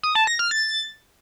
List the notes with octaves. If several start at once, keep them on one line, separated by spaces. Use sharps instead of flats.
D#6
A5
A#6
F6
A6